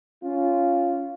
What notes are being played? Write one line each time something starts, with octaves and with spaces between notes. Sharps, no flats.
C#4 F4